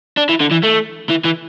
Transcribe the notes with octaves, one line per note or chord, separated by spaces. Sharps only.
D4
E3
D3
E3
A3
E3
E3